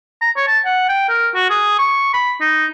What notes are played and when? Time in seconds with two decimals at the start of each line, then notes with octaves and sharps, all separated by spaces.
0.21 A#5
0.36 C#5
0.48 A5
0.65 F#5
0.89 G5
1.09 A#4
1.35 F#4
1.50 G#4
1.79 C#6
2.14 B5
2.40 D#4